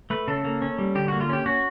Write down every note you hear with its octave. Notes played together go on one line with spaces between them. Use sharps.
A3 B4
C#3 A4
A#3
C#4
G3
D3 G4
A#3 F#4
F4
C#4 G4
C#4 F#4